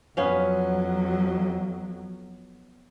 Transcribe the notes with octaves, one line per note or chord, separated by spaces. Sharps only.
F2 F#3 B3 C#4 F5